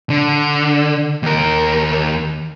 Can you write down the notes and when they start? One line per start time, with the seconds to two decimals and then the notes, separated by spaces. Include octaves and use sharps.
0.10 D3
1.23 D#2 A#4